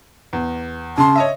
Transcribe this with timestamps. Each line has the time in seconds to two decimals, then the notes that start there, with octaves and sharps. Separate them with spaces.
0.33 E2
0.98 C#3 A5 C6
1.16 C#5 D#5 E5